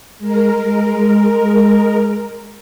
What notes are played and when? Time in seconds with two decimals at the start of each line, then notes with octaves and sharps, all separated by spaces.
0.19 G#3 A#4